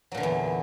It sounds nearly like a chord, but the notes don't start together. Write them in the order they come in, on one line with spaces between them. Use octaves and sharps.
F#3 A#2 D3 E3 E2